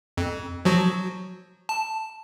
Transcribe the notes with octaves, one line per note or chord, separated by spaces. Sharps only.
F2
F3 F#3 F#4
A5